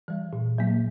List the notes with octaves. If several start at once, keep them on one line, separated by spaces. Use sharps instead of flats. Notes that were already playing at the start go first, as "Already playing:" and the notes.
E3 G3
A#2
F#3 A#3